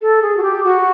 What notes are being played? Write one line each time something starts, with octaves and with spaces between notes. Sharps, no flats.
A4
G#4
F#4
G4
F#4